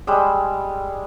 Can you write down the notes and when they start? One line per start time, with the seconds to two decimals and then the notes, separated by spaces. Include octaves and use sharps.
0.07 G3 G#3 E6